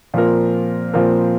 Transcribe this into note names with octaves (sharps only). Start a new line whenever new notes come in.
A#2 F3 C4 F4 A#4
A#2 F3 C4 F4 A#4